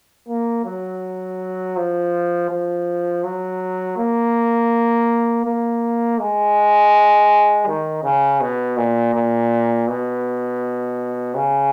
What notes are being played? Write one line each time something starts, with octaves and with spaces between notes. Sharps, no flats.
A#3
F#3
F3
F3
F#3
A#3
A#3
G#3
D#3
C#3
B2
A#2
A#2
B2
C#3